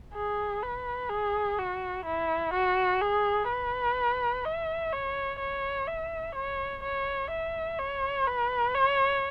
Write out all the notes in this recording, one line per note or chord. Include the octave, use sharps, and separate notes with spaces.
G#4
B4
G#4
F#4
E4
F#4
G#4
B4
E5
C#5
C#5
E5
C#5
C#5
E5
C#5
B4
C#5